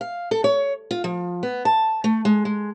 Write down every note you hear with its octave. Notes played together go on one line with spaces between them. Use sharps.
F5
A4
C#5
F4
F3
B3
A5
A3
G#3
G#3